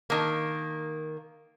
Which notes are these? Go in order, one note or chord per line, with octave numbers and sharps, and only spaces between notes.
D#3 A#3